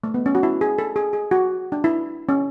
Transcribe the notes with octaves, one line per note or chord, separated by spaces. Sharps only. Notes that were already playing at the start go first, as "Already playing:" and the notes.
A3
B3
C#4
F#4
E4
G#4
A4
G#4
G#4
F#4
D4
E4
C#4